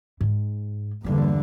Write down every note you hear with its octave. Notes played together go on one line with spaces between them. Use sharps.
G#2
E2 G2 D3 G3 A#3